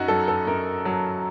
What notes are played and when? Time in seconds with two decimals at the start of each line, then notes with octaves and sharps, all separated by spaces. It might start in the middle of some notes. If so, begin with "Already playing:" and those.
Already playing: F#2 D#4 F#4
0.08 F#3 A4
0.28 A4
0.47 F#2 A#4
0.85 F#3